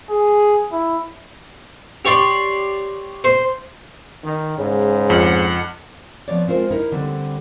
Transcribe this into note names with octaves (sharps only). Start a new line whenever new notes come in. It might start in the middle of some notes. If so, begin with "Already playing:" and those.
G#4
E4
G4 C#5 D5 C6
C5
D#3
G#2 C#3
F2 F#5
F3 B3 C4 C#5 D5
G#3 C4 F4 A#4 C5
D#4 E4 A#4
D3 G3 C4